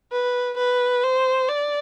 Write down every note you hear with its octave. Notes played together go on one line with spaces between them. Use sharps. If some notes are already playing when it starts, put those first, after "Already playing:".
B4
B4
C5
D5